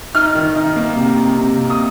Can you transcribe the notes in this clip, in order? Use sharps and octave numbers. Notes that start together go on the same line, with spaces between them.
D#4 F6
D#3
D#4
A#3
C3
C3
C3
A#3
D#6